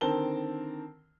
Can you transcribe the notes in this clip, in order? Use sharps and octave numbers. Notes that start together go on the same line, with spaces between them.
D3 D#3 C4 A#4 A5 G7